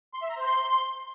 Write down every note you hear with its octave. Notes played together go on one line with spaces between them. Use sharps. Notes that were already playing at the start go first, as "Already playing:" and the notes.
C6
E5
A#5
C5
C6